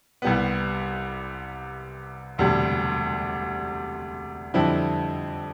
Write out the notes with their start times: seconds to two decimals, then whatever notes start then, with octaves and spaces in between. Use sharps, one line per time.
0.22 C2 C3 G3 B3
2.38 E1 D2 C3 G3
4.54 F2 D3 G3 C4 E4